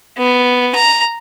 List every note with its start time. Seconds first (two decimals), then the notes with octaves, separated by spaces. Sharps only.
0.18 B3
0.75 A#5